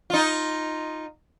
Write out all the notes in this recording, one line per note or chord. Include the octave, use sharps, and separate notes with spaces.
D#4 F4